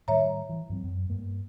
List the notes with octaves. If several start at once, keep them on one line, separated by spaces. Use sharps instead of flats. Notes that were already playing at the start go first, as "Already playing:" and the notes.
A2 D#3 G3 C#5 E5 A#5
E3
G2 F#3 C4
F#2
G2 A#3